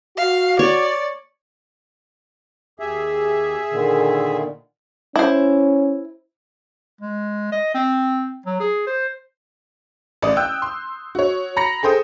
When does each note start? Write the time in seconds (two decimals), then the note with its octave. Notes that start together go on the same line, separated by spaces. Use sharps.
0.17 F#4 F5
0.59 C#5 D5
2.79 D#2 G4 G#4 E5
3.71 A#2 D3 D#3
5.16 C#4 E4 C5
7.01 G#3
7.52 D#5
7.74 C4
8.46 F#3
8.60 G#4
8.87 C5
10.23 A1 D5 D#6
10.37 G5 E6 F#6 G6
10.62 C6
11.15 F#4 C#5
11.57 A#5 B5 A#6 C#7
11.83 G#4 A4 C5 G5 D#6